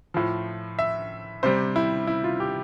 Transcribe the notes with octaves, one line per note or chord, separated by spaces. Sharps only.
A2 F3
E5
C3 G3 C5
E4
E4
F4
G4